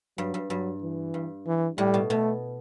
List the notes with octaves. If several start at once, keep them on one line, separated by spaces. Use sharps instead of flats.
G2 F#3
G2
G2 F#3
E3
G2
E3
A2 G3
B2
B2 A3